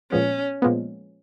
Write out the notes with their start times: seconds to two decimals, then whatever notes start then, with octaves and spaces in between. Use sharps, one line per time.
0.12 A#2 F3 G#3 B3 C#4
0.62 A#2 F3 G#3 B3